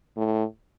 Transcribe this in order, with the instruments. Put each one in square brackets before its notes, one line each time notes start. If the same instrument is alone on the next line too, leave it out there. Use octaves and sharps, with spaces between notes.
[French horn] A2